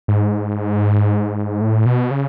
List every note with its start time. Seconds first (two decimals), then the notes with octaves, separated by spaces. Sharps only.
0.08 G#2
1.61 A2
1.86 B2
2.11 C#3